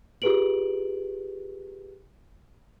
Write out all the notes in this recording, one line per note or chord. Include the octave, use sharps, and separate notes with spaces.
F4 G4 G#4 B4 D7 F#7